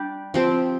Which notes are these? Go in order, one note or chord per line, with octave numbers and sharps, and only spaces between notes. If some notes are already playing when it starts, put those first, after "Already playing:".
Already playing: G3 D4 G4
F3 C4 G4